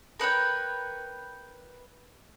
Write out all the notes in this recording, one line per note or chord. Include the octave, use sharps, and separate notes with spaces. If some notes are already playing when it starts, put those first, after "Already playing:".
A#4 B4 C#5 G5